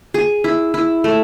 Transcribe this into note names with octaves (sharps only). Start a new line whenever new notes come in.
G#4
E4
E4
A3